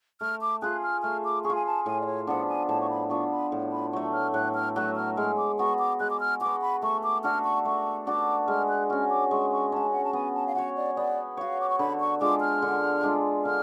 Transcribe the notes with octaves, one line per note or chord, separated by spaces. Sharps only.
A3 F6
D6
F4 G#4 F#6
F6
A3 F6
D6
G#4 C#6
F4
G#5
A5
A2 G#5
D5
C#5
F3 B3 D4 F#5
G#5
A2 A5
C#6
B5
F3 B3 D4 C#6
B5
A2
B5
F#3 A3 C#6
F6
A2 F#6
F6
F#3 A3 F#6
F6
G#3 F6
D6
B3 F#4 C#6
D6
G#3 F#6
D6
F6
B3 F#4 D6
B5
A3 C#6
D6
D4 F#4 A4 F6
C#6
A3 C#6
D4 F#4 A4 D6
G#3 F6
F#6
C#4 F#4 F6
D6
G#3 C#6
C#6
C#4 F#4 A5
F#5
A5
B3 G#5
A5
F5
F#4 C#5 F#5
D5
B3 D5
F#4 C#5 F5
D6
C#6
D3 B5
C#6
G#3 D4 F4 D6
F6
D3
G#3 D4 F4
D3 F6